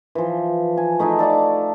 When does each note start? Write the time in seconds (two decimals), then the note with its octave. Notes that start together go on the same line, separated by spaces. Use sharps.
0.15 E3 F3
0.77 G#5
0.99 A3 D#4 E4 G#4
1.19 A4 D5 F5 D6